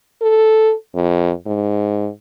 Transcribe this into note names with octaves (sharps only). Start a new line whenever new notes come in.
A4
F2
G#2